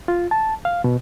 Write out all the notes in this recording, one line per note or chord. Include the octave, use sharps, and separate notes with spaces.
F4
A5
F5
B2